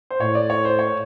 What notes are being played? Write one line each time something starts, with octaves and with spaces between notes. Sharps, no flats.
C5
A2 C#5
D5
C#5
C5
C#5